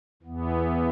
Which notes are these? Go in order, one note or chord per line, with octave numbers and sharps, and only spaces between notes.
E2 E3 B3